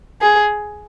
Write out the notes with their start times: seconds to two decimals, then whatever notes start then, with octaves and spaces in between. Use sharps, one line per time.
0.22 G#4